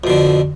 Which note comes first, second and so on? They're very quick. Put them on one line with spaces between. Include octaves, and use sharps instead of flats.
F2 B2 D3